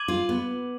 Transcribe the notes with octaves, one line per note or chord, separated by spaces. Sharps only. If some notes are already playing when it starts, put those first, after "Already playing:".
Already playing: D6 G#6 D#7 F#7
F4
B3